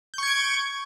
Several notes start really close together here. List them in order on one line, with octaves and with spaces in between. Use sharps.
G6 C#6 G#6 D7